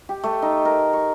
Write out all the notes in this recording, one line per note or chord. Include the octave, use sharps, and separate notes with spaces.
G4
A3
D#4
A#4
C#6